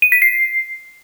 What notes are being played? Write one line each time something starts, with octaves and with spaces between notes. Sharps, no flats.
D#7
B6
C7